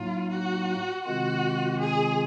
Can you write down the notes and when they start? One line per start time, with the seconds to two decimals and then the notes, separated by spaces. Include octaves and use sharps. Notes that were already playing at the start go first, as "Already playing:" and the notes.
Already playing: A2 F#3 A#3 D#4 F4
0.30 F#4
1.05 C3 D#3 G#3 C4 F4 F#4
1.80 G#4